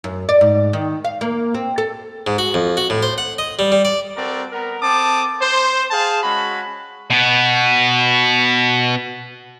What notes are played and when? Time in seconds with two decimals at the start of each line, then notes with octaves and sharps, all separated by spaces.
0.04 F#2
0.29 D5
0.41 G#2
0.73 D#3
1.04 F5
1.21 A#3
1.54 C4
1.78 A4
2.27 G#2
2.38 F#4
2.54 F2
2.77 F#4
2.90 A2
3.03 C5
3.18 F#5
3.38 D#5
3.59 G3
3.72 G3
3.85 D5
4.17 C4 F#4 A4 A#4 D5
4.52 B3 A#4
4.82 C4 A4 A5 D6 D#6
5.41 C5
5.91 G#4 F5 G5 A5
6.23 G#3 C#4 F#4 B5
7.10 B2 B3